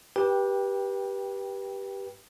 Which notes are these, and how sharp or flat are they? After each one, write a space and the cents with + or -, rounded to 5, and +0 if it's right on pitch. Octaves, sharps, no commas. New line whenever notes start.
G4 +0 B4 -25 G5 +10